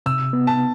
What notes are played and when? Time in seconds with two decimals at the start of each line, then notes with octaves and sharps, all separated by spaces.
0.06 C3 E6
0.33 B3
0.47 A5